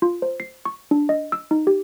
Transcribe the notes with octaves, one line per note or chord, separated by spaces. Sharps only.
F4
C5
C7
C#6
D4
D#5
E6
D#4
G4